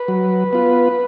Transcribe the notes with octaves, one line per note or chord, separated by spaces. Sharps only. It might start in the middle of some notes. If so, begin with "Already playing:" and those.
Already playing: B4
F#3
B3 F4